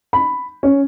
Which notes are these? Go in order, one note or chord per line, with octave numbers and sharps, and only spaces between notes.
B5
C#4